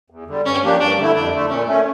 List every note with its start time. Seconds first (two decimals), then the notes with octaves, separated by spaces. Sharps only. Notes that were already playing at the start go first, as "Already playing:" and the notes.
0.10 E2
0.27 D3 G3
0.45 G2 C#4
0.63 F3 A#3 D4 G4
0.80 G2 D4
0.98 D3 A3 E4
1.15 F2 D4
1.32 D3 A3
1.50 A#2 C#4
1.67 A3 C#4